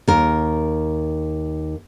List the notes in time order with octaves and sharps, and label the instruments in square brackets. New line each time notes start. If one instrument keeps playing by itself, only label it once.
[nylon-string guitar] D#2 A#4